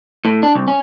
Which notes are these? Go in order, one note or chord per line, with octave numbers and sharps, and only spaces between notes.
A2
D4
C2
C#4